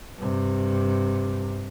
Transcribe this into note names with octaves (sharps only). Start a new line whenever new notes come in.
G2 C3